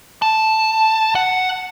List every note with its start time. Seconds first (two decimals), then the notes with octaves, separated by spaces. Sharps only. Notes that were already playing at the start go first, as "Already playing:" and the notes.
0.22 A5
1.15 F#5